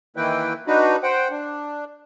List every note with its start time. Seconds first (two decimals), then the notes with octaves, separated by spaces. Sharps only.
0.16 D#3 E3 A#3 E4 B4 G5
0.67 D4 D#4 F#4 B4
1.03 C5 F#5 G5
1.31 D4